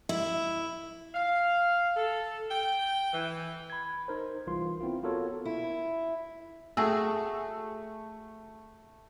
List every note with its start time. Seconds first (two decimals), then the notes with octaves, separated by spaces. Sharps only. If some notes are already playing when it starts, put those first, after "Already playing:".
0.09 E4
1.14 F5
1.96 A4
2.50 G5
3.13 E3
3.70 B5 G#6
4.08 D#4 A#4 C5
4.47 C2 E3 F4 C6
4.81 B3 C4 E4 F4
5.03 B3 F4 F#4 A4 A#4 C#5
5.45 E4
6.77 A3 F#4 G#4 E6